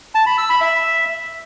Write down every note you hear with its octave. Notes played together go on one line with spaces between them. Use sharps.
A5
B5
E6
B5
E5